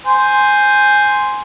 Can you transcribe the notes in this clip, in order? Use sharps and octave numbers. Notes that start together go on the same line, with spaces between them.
C5 G#5